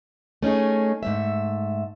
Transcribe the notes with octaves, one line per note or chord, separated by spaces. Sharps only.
A3 C#4 D#4 G#4
G#2 A3 E5